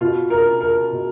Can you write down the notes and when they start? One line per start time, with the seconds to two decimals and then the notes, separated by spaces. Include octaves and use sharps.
0.01 B2 F4
0.30 A#4
0.61 A#4
0.91 B2